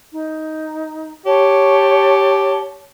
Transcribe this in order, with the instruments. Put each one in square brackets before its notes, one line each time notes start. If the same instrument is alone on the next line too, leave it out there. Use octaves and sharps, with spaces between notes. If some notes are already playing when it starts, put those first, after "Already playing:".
[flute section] D#4
[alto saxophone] G4 [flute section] C#5 A5